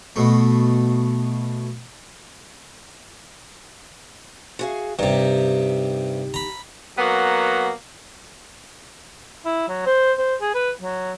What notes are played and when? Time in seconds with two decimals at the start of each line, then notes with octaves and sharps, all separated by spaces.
0.16 B2 A3
4.59 F#4 G#4 F5
4.99 G2 C3 D#4 G4
6.34 A#5 B5
6.99 F#3 A#3 B3
9.45 E4
9.68 F#3
9.86 C5
10.18 C5
10.41 G#4
10.54 B4
10.81 F#3